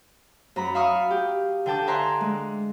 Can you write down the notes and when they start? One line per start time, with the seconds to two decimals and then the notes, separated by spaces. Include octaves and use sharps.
0.56 F#2 A#5 B5
0.75 E5 F5 B5 C#6 D#6 F6
1.11 G4
1.66 D3 G5 A5 D6
1.87 E5 G#5 A#5 C6 D6 F#6
2.21 G#3